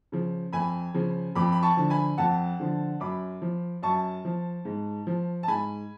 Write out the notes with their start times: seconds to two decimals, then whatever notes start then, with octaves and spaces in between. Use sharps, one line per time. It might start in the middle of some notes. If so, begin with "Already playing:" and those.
0.12 C#3 F3
0.53 F2 G#5 B5
0.94 C#3 F3
1.35 F2 B5 D6
1.52 B5
1.63 A5 C#6
1.77 D3 F3
1.90 G#5 B5
2.18 F2 F#5 A5
2.60 D3 F3
3.00 F#2 B5 D6
3.42 F3
3.83 F#2 A5 C#6
4.25 F3
4.65 G#2
5.07 F3
5.43 A5
5.48 G#2 G#5 B5